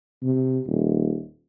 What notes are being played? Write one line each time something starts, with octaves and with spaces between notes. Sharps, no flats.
C3
D#1